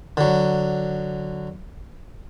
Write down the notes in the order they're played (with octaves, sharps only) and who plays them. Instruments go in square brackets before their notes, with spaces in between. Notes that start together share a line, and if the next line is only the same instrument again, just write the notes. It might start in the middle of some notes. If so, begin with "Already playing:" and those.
[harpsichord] D3 F#3